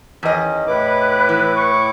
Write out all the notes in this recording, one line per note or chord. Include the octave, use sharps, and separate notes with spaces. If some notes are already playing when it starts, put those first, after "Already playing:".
E2 D#3 C#4 D#5
A2 E4 B4 D6
E3
C#6